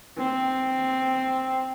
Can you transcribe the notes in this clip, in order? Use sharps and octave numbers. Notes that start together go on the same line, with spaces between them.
C4